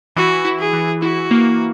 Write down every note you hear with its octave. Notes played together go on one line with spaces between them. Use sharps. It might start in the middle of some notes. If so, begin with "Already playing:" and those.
E3 F#4
E4
G#4
E3
E4 F#4
A#3